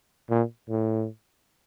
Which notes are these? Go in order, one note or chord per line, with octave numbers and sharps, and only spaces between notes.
A#2
A2